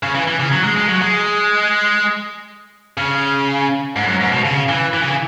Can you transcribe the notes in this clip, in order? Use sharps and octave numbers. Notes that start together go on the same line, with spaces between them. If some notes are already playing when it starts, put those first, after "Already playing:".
C#3
E3
E3
C#3
F#3
G#3
G#3
F#3
G#3
C#3
G#2
F#2
G#2
B2
C#3
E3
E3
C#3
E3